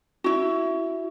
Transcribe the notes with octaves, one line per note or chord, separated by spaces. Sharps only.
E4 F#4